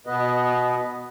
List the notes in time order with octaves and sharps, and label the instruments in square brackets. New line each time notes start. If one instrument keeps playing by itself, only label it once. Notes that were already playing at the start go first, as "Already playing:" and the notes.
[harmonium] B2 B3 B4 D#5